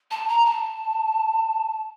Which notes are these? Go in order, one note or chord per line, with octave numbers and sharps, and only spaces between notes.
A5
A#5
A5